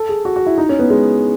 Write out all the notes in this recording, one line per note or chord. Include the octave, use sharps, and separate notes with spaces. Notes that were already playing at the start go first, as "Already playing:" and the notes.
Already playing: A4
G#4
F#4
F#4
E4
D#4
C#4
B3
G#3